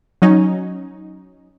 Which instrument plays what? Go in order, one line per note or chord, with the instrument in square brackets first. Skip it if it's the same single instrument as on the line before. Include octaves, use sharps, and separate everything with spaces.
[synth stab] F#3 C#4 D#4